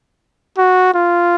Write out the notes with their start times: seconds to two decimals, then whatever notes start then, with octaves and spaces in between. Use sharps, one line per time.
0.58 F#4
0.94 F4